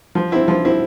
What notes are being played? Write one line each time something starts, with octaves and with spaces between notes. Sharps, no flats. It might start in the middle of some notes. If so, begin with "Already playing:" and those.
F3
C4 E4
F3
C4 E4